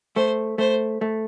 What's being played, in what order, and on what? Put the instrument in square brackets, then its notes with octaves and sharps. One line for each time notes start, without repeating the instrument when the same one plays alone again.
[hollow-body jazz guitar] A3 [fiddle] C5
[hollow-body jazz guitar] A3 [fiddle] C5
[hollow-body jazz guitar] A3